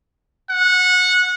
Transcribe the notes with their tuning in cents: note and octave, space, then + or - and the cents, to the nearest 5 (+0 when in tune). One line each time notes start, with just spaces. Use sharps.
F#5 -20